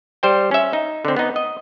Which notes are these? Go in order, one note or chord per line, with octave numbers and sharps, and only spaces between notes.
G3 C5 G5
C#4 E5
D#4
D3 C4
B3 D#4
D#5